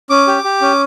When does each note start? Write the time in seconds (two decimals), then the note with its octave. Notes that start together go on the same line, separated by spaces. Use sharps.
0.10 C#4 D6
0.27 G4
0.44 G4
0.61 C#4